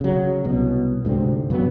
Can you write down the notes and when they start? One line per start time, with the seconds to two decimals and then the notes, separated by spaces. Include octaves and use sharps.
0.01 C#3 F#3
0.44 C2 B2 F#3
1.05 D2 G#2 C3 C4
1.50 G2 C3 F#3 B3